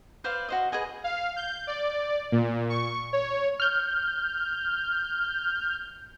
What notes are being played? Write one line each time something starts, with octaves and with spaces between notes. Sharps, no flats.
B4 C5 D5 F5
F#4 C5 D#5
G#4 B4 D#5 G#5
F5
G6
D5
A#2
C#6
C#5
F6 G6